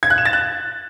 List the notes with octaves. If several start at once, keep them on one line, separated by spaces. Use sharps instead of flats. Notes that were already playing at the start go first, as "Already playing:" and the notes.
G#6
F#6
E7
A6
F#6